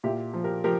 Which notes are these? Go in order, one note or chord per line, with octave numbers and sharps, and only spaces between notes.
A#2 E4 G4
F3
G4 A#4
F3 G4 A#4